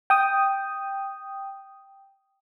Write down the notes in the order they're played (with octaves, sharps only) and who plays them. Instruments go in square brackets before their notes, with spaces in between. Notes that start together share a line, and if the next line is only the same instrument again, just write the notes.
[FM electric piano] G5 D#6